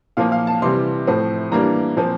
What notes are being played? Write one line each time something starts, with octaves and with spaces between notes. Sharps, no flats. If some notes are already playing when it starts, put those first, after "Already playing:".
A#2 F3 A#3 F5
F5
A5
C3 E3 G3 C6
A2 F3 C4
E3 G3 A#3 D4 A#5
A#2 F3 C4